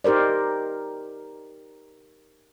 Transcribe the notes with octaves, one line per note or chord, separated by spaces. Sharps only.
D#4 G4 A#4 C5 D5